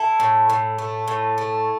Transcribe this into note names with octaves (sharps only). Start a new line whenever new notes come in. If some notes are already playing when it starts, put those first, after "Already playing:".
Already playing: E4 A4
A2
A2
A3
A2
A3